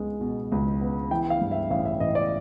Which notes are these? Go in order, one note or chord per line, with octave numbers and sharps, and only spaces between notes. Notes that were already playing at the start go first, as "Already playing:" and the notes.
Already playing: C#2 G#3 B3
B2
C#2
B3
E3 G5
F5
G2
E5
A1 F5
E5
A1 D#5
D5